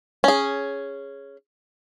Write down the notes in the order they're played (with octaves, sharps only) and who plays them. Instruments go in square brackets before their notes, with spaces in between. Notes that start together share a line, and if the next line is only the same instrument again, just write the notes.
[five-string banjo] C#4 G#4